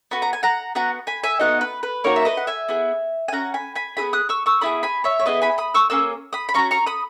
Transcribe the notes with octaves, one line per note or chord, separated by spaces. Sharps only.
B3 F#4 B5
A#5
G#5
F#5 A#5
B3 F#4 F#5 A#5
G#5 B5
E5 G#5
B3 D#4 F#4 D#5 F#5
B4
B4
A#3 D#4 F#4 A#4 C#5
E5
B4 D#5
F#5
E5 G#5
B3 E4 G#4
G#5
C#4 F#4 F#5 A#5
G#5 B5
G#5 B5
B3 E4 G#4 B5 D#6
D#6 F#6
C#6 E6
C#6 E6
B3 E4 G#4 B5 D#6
G#5 B5
C#5 E5
C#5
B3 E4 G#4 B4 D#5
G#5 B5
B5 D#6
C#6 E6
A#3 C#4 G#4 E6
B5 D#6
B5
C#4 F#4 A#5 C#6
A#5 C#6
B5 D#6